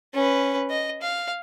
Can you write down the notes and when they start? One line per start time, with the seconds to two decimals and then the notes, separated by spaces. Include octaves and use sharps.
0.14 C#4 B4
0.70 D#5
1.02 F5